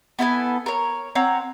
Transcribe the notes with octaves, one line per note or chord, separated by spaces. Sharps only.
B3 E4 A4 G#5
A#4 C#5
C4 C#5 F#5 A#5